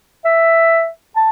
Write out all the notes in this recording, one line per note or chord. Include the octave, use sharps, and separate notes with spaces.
E5
A5